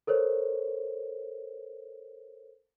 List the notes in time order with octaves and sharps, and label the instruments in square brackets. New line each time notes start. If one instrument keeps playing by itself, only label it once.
[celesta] A4 A#4 C5 C#5